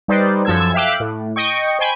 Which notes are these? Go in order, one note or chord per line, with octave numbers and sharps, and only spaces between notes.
G3 D#4 B4 C5 D5
F#2 F3 A4 E6 G#6
E5 F5 G5 D6 F#6
A2
D#5 G5 C#6
C5 G5 G#5 B5